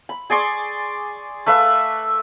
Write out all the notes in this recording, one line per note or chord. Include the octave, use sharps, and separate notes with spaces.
B5
G#4 D5 C6 C#6
A3 B4 E5 F5